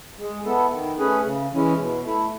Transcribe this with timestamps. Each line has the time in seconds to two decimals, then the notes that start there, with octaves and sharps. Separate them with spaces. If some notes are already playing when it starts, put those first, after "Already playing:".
0.18 G#3
0.45 B3 E4 A4
0.72 D#3
0.98 A3 C#4 G#4 B4
1.25 C#3
1.52 E3 G#3 C#4 E4
1.78 B2
2.05 A3 E4